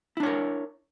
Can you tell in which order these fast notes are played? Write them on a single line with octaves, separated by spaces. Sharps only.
E4 D4 C#5 A#4